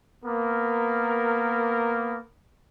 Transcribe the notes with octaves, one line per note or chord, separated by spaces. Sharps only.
A#3 B3 A#4